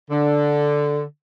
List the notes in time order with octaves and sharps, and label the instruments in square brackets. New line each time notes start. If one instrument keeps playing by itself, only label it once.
[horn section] D3